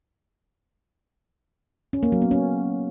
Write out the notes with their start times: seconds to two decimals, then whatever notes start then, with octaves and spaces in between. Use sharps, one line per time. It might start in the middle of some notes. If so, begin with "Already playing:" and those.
1.93 C#4
2.03 A#3
2.12 F#3
2.22 B3
2.31 C#4